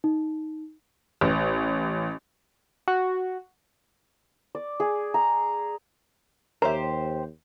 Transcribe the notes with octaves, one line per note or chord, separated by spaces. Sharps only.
D#4
A1
F#4
D5
G#4
A#5
D#2 G4 A#4 C5 C#5 E5 A#5